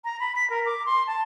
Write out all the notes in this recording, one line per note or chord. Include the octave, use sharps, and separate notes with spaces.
A#5
B5
B6
A#4
D6
C6
A5